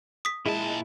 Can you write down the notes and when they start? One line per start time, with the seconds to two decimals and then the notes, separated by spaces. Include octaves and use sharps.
0.25 D#6 B6
0.46 A#2 G#3 E4 A5